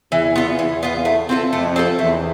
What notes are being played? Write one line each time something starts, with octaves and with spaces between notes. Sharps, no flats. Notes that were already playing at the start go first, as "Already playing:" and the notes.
E2 E3
B3 F4
E2 E3
B3 F4
A3
C4 F4 A4
F2 A3
C4 F4 A4
E2 A3